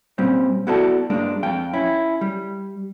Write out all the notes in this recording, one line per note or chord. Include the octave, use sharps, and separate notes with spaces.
A#2 G3 C4 C#4
B3 E4 F#4 A4 D5 A5
G2 G#3 A#3 D4
F2 F5 G5
C#4 E4
G3